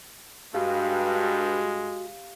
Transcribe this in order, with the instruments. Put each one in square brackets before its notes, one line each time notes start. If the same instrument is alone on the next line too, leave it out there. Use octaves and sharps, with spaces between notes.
[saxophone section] G2 [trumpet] G#3 [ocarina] F#4 [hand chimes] G4 F5